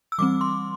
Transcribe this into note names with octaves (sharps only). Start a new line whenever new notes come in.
E6
E3 G3 C4 D6
C6